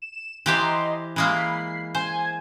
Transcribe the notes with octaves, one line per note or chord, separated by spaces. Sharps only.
E7
E3 G4 C5 D#5 A#5 C6
E3 G#3 A#3 B5 C7
C5 G#5 G#6